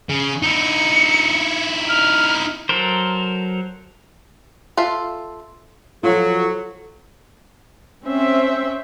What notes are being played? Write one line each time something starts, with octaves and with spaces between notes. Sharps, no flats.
C#3
D#4 E4 C#7
F6
F#3 A4 A#4 C5
F4 A4 E5 F5
F3 F#3 F4 A4
C4 C#4 C5 E5